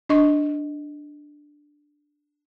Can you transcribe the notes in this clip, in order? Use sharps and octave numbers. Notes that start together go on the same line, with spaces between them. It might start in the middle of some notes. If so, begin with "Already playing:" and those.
D4 D#5 C#6